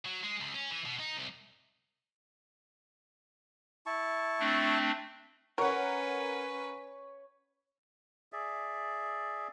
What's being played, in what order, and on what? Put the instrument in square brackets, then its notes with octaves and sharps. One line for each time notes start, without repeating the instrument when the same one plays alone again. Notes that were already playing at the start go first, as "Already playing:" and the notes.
[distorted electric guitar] F#3
G#3
C#2
C#4
E3
B2
D#4
C2
[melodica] E4 A5 C#6
[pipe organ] A3 C4 D4
[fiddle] C#4 B4 [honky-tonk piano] A#4 F#5 [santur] C#5
[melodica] G#4 D5 E5